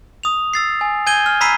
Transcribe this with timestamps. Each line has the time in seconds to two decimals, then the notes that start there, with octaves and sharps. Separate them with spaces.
0.23 D#6 F7
0.54 E6 A6 C7
0.81 G#5
1.06 G#5 G6 G#6 D#7 G7
1.26 F6
1.41 A#5 B5 E6 B6 C7 D#7